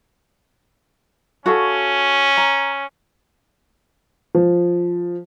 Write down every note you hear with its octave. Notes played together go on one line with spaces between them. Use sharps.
C#4 F#4 A4 F5
A#5
F3